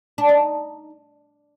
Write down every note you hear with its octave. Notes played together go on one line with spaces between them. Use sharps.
D4
D#4